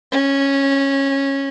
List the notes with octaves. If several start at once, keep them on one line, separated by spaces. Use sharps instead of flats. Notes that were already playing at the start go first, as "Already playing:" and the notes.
C#4